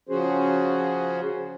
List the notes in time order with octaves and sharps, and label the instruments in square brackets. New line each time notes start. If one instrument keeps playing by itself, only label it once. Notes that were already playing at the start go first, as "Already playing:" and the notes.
[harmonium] C#3 F3 C#4 F#4 G#4 C5